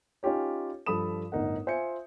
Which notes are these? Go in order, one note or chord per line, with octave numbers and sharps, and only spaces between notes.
C#4 D#4 F4 G4 C#5
G2 F3 A4 B5 D#6 E7
G1 A2 D#4 A#4 F#5
F4 C5 E5 G#5 G6 C#7